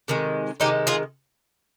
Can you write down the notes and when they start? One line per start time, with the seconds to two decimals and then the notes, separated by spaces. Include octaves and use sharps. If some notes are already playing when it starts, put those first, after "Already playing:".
0.08 C3 D#3 G#3
0.60 C3 D#3 G#3 D#4 G4
0.87 F4 G#4